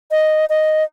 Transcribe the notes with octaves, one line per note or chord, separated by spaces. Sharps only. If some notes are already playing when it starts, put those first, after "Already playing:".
D#5
D#5